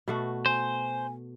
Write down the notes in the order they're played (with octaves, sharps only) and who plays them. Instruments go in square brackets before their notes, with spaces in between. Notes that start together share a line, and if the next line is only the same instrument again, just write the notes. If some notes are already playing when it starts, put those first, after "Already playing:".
[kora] B2 A3 F#4
[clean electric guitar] C5 [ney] G#5